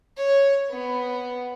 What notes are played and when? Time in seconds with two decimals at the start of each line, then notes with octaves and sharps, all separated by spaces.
0.17 C#5
0.70 B3